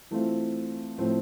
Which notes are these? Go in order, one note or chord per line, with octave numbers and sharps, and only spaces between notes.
E3 A3 C4 F4
A2 F3 A3 C4